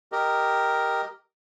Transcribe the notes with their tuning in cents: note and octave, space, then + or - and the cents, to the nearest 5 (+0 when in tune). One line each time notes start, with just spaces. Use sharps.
G4 +0 A#4 +0 D#5 +0